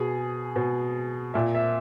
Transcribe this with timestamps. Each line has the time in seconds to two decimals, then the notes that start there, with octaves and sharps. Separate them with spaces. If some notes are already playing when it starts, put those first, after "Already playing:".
Already playing: B2 G#4
0.56 B2
1.34 A#2 E5
1.55 E5